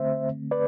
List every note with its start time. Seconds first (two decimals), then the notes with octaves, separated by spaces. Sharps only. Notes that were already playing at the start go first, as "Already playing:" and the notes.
Already playing: D3 A3 C4 C5 E5
0.51 B4 D5